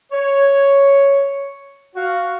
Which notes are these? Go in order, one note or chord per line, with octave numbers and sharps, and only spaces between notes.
C#5
F#4 F5